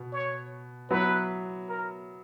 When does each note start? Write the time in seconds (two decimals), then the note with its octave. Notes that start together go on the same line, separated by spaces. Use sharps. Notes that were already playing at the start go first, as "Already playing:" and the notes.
Already playing: B2
0.12 C#5
0.90 F#3 B3 E4 B4
1.69 A#4